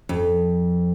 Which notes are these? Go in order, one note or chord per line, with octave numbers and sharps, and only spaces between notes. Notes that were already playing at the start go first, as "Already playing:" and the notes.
F2